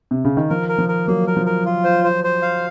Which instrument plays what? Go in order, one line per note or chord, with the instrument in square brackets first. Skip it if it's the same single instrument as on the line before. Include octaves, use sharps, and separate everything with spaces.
[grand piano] C3
C#3
D#3
[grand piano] F3 [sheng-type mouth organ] A#4
[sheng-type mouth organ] A#4
[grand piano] F3
[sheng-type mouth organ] A#4
[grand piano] F#3 [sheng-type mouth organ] A#3
[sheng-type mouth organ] A#4
[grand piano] F3
[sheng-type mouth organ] A#4
F4
C5
C5
C5
F5